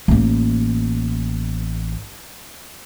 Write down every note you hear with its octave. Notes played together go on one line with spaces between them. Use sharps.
A1 A#3